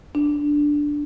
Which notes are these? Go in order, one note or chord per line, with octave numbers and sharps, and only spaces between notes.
D4